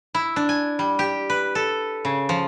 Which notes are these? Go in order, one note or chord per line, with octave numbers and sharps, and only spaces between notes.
E4
D4
G#5
G3
G4
B4
A4
C#3
F3